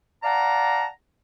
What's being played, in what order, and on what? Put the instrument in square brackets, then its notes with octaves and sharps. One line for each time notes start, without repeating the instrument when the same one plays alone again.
[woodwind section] D5 F5 F#5 A5 A#5